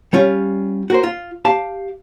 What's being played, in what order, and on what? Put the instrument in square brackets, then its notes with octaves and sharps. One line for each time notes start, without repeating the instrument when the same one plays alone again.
[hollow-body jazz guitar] G3 C#4 F4
F#4 A#4 C5
F4
G4 F5 A5